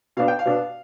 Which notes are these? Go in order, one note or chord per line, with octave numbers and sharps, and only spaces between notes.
B2 B3 D4 F5
G5
F5
B2 B3 D4